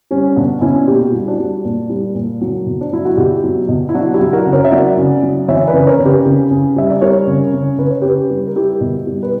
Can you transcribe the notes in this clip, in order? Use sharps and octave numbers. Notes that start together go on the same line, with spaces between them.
G3 C#4
B2 B3 D4
B2 C#4 E4
A#2 G4
F#4
G3 E4
D4 F#4
G3
A#2
G3
A#2
F#3
B2
D4
F#3 E4
F#4
B2 E4 G4
F#3
B2
E4
F#3 D4 F#4
E4 G4
F#3
F#4 A#4
C#3
A#4 C#5
E5
F#3 D5 F#5
C#3
F#3
E3 C#5 E5
B4 D5
C#3
B4
A#4 C#5
C#3
G4 B4
C#3
C#3
G3 E5
D5
G3 A#4 C#5
C#3
C#3
C#3 B4
C#5
C#3 G4 B4
G3
A#4
G3 E4 G4
B2
G3
B4